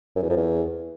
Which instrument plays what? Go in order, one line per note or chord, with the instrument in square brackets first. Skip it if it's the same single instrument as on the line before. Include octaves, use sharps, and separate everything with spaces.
[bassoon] F#2
E2
F2
E2